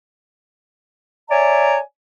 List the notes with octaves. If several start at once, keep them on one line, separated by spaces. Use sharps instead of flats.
C#5 D5 E5 G#5 A#5